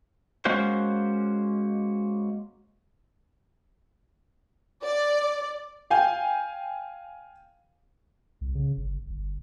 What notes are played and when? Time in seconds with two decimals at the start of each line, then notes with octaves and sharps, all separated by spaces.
0.45 G#3 A#3 C#4 F#4 C5
4.83 D5
5.90 F5 G5 G#5 G6
8.41 C2
8.55 C#3
8.77 G1
9.10 G1